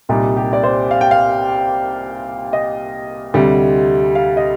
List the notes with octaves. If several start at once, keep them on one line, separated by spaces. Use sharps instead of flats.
C2 A#2 G3 D#4
G4
D5
C5
F5
G5
F5
D#5
D2 C3 G3
F5
D#5